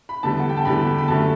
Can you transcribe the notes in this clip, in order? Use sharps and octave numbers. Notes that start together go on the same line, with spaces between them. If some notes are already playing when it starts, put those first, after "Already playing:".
B5
E2 D3 G3 A5
F#5
G5
A5
E2 D3 G3 B5
B5
F#2 D3 A3 A5